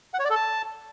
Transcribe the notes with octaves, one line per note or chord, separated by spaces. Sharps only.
F#5
C#5
D5
A4
A5